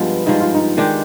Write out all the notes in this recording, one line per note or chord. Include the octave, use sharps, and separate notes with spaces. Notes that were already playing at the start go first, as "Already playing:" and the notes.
Already playing: G2 F3 G#3 B3
G2 F3 G#3 D#4
F4
D#4
D#3 G#3 D4 G4